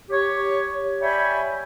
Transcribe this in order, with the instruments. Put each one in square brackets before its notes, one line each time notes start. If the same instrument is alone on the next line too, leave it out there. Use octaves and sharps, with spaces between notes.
[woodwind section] G4 C#5
C#5 D5 E5 G5 G#5 B5